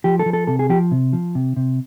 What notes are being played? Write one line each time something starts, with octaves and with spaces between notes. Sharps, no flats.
F3 G4
A4
F3
A4
C3 A4
G#4
F3 G4
C3
F3
C3
C3